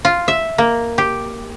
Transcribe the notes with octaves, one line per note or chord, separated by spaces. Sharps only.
F4
E5
A#3
G4